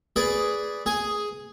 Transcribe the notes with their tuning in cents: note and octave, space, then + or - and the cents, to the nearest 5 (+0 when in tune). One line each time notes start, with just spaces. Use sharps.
G#4 +0 B4 +0 D5 -10
G#4 +0 G#5 +0